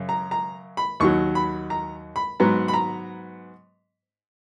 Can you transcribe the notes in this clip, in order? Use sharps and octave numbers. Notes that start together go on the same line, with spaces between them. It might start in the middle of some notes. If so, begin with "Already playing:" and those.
Already playing: F#2 C#3
A#5
A#5
B5
D#2 D#3 F#3 C#6
B5
A#5
B5
G#2 F#3 B3 A#5
B5
A#5